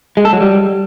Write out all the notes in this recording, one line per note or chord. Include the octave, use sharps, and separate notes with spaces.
G#3
A4
F#3
G3